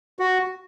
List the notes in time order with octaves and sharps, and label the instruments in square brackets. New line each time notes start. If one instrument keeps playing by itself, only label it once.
[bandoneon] F#4